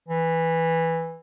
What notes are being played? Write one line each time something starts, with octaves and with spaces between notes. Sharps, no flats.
E3